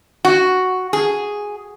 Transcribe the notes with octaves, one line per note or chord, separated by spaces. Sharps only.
F#4
G#4